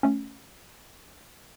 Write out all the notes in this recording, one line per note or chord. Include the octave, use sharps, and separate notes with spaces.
A3 C#4